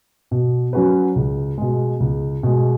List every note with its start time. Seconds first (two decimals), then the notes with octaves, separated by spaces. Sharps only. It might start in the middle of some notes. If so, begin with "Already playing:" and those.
0.31 B2
0.73 F#3 C#4 F#4 B4
1.16 C#2
1.58 B2 G#3
2.00 C#2
2.43 B2 G#3